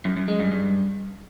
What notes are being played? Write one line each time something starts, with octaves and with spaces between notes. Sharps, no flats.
F#2
F#2
G#3
G2
G2